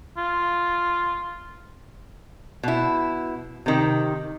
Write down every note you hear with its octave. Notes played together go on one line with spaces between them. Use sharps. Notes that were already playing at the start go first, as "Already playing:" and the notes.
F4
B2 E4
C3 D#3